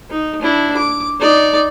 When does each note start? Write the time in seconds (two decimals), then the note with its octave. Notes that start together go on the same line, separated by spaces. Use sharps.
0.10 D#4
0.42 D4 E4
0.77 D6
1.20 D#4 D5